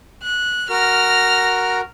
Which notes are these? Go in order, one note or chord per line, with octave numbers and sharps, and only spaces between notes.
F#6
F#4 A#4 F6 A#6